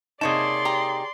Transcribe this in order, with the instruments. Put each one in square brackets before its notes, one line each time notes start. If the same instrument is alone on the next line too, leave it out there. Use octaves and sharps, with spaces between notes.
[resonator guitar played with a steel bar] C3 A#3 D#4 [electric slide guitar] G#4 C#5 A5 [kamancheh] D5 C6
[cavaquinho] G4 A#5 D#6